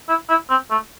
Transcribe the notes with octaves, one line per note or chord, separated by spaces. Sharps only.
E4
E4
C4
A3